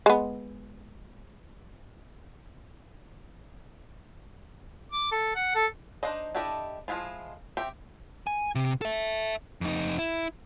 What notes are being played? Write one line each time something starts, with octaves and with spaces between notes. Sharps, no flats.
G#3 B3
D6
A4
F#5
A4
D4 D#4 C5 D#5
D4 E4 G4 A4 D#5
F3 F#3 G#3 E4 F4
C4 G4 E5 G5
G#5
C3
A4 E5
F2 D#4
E4